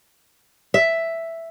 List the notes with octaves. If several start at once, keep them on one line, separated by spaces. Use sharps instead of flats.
E5